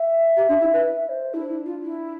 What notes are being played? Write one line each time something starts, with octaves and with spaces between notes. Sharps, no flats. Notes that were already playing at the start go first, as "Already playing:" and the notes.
Already playing: E5
G4
D4
E4
B4
E5
C5
D4 E4
E4
F4
E4